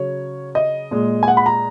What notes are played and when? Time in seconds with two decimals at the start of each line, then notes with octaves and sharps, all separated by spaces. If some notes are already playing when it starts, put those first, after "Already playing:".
Already playing: C#3 F#3 C#5
0.55 D#5
0.91 A#2 G#3
1.23 G#5
1.28 F#5
1.37 B5
1.46 A#5